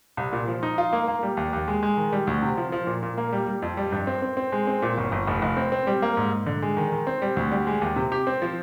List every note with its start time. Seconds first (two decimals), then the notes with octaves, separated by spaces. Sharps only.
0.17 C2
0.33 A#2
0.48 F3
0.63 D#4
0.78 F4
0.93 A#3
1.08 A#3
1.23 G3
1.37 D#2
1.53 D#2
1.68 G#3
1.83 G#3
1.97 D#3
2.12 G3
2.27 D2
2.43 C3
2.57 F3
2.72 F3
2.87 A#2
3.03 A#2
3.18 A#3
3.33 G3
3.47 G3
3.62 F2
3.77 G3
3.92 G2
4.07 C4
4.22 C4
4.37 C4
4.52 G#3
4.67 C4
4.82 A#2
4.98 G1
5.12 G1
5.27 F1
5.42 F1
5.57 C4
5.72 C4
5.87 G3
6.02 A#3
6.17 G#2
6.32 G#2
6.46 D3
6.62 G#3
6.77 D#3
6.92 D#3
7.07 C4
7.22 G3
7.37 D2
7.52 G3
7.67 G#3
7.82 D#2
7.96 C3
8.12 G4
8.27 C4
8.42 F3